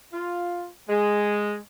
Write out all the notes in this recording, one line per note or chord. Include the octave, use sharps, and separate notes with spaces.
F4
G#3